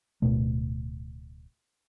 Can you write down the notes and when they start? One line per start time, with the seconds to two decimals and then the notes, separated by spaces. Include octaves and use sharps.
0.22 D1 B2 A3